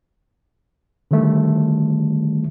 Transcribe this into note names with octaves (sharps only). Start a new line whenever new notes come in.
D3 D#3 G3 A3